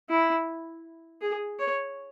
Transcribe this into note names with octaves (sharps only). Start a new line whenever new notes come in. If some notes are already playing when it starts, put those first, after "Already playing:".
E4
G#4
C#5